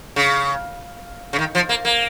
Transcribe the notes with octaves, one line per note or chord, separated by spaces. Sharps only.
C#3
C#3
D#3
F3
A#3
A#3